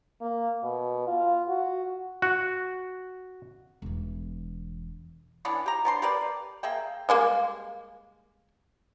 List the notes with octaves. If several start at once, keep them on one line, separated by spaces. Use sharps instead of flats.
A#3
B2
F4
F#4
F#4
E1 E3
E3 B3 C#4 D4
G4 A#5
B3 D4 C6
G4 A#4 B4 D5
A#3 G#4 E5 G5
G3 G#3 A#3